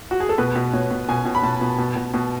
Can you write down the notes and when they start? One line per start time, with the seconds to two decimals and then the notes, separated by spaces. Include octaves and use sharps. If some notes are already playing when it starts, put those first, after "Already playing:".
0.11 F#4
0.20 G#4
0.29 A4
0.38 B2 B4
0.55 B2
0.73 B2 C#5
0.91 B2
1.09 B2 G#5
1.25 B2
1.35 B5
1.43 B2 A5
1.61 B2
1.78 B2
1.96 B2
2.14 B2